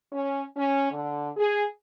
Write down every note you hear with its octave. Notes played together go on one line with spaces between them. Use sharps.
C#4
C#4
D3
G#4